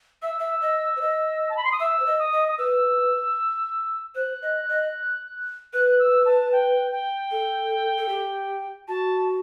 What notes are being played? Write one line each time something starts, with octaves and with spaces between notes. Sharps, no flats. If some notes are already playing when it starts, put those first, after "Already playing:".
E5 E6
E5
D#5
C5
D#5
A5
B5
C6
D#6
E5 E6
C5
D#5
D#6
D#5
D#6
B4 E6
C5 F#6
D#5
D#5
B4 F#6
F#6
E6
A5
G5
G5
A4
A4
G4
F#4 A5